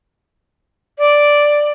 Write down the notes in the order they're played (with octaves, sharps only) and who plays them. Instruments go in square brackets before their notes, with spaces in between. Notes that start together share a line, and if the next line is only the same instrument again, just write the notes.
[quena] D5